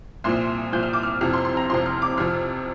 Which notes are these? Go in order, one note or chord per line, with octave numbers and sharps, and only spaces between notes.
C2 A#2 F3 C6
C2 A#2 F3 G6
F6
D6
F6
F2 C3 F3 F6
C6
C6
A#5
F2 C3 F3 C6
F6
D6
F2 C3 F3 F6